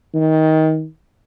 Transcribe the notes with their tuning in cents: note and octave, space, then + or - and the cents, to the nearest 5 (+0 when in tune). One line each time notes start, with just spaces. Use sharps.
D#3 +20